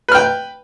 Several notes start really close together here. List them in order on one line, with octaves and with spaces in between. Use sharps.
B4 F6 G5